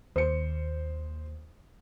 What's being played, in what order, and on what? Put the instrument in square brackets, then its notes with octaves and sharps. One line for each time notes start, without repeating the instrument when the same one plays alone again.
[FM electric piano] D#2 [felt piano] C5 C#7